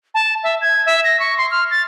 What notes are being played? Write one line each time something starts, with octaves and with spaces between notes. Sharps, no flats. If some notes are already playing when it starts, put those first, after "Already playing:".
A5
E5
G#6
E5
A#6
C#6
C6
F6
A6